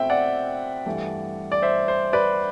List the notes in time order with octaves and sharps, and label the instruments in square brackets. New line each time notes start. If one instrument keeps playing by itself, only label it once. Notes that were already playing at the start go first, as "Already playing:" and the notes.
Already playing: [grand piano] B2 A3 C4 E4 E5 G5
D5 F#5
G2 E3 A3
D5
C5 E5
C5
B4 D5